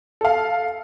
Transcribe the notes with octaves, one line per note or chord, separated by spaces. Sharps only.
A4 F5